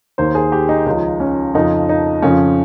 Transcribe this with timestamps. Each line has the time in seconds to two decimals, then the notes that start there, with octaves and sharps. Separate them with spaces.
0.18 D#2 D#3 C5
0.35 G#4
0.52 G4
0.69 D#4
0.86 C#2 C#3 F3 D#4
1.20 C#4
1.54 F2 C#3 F3 D#4
1.89 D#4
2.22 F2 C#3 F3 C#4